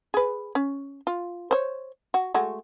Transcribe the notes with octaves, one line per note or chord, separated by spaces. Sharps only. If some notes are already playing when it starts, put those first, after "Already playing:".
G#4 B4
C#4
F4
C5 C#5
F#4
G#3 A3 F#4